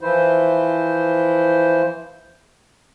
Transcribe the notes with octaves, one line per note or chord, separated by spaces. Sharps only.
E3 F3 E4 C5